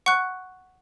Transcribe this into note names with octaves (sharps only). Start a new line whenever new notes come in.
F#5 C#6 F#6